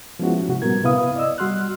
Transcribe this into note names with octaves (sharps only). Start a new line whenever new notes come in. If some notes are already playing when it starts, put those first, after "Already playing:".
F3 G#3 B3 C#4 E4 F#4
C3 F#4
A#2 G3 B3 A#4 G#6
C3 B3 E4 B4 F5 D#6
D5 D#5 E6
G3 F#4 C6 F6 F#6